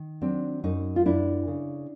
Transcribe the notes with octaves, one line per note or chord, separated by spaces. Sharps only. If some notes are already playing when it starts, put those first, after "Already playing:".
Already playing: D#3
F#3 C4 D4
F#2 C#4 D#4
F4
F#2 D4 E4
C#3